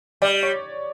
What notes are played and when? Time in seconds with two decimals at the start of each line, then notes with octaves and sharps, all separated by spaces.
0.22 G3 D5
0.43 C#5